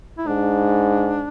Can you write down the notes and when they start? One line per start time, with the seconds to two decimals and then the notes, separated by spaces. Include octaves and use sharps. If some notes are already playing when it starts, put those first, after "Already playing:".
0.18 E4
0.26 G#2 D4